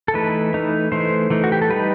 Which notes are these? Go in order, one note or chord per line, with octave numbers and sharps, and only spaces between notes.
A4
E3 A3 D#4 B4
E3 A3 D#4
E3 A3 D#4 C5
E3 A3 D#4
F#4
G4
A4
G3 D#4 B4